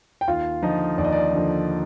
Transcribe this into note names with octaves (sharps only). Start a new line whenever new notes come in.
G5
D#2 F4 F5
D3 F3 D#4 D#5
D#2 D5
D#5
D5
D3 F3